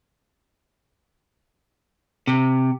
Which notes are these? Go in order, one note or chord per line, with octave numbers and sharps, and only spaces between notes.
C3